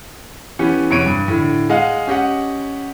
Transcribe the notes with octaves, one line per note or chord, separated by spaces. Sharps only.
E3 B3 C#4 G4
E2 C3 B3 C#5 D7 D#7
G2
A2 D3
G#3 D#5 F5 F#5
C#4 G4 D#5 F#5